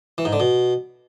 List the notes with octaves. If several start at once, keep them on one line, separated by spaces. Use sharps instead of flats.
E3
G#2
D3
B2